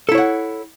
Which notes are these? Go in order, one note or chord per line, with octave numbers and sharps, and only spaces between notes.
E4 A4 C#5 F#5